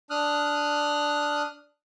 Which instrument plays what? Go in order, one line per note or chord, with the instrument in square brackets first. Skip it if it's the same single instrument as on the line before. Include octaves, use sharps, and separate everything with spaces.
[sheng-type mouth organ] D4 D#6 F6 F#6